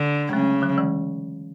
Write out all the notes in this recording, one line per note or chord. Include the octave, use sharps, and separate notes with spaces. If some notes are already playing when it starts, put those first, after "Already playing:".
Already playing: D3
G#3
C#3 F#3 A3
D3 F#3
E3 G#3